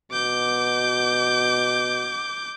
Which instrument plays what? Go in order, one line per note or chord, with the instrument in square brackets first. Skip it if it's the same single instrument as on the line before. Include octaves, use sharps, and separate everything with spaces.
[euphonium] B2 [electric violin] D6 G6